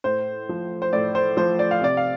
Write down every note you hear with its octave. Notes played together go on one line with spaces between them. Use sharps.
A2 C5
F3
C5
A2 D5
C5
F3 C5
D5
F5
C3 D5
F5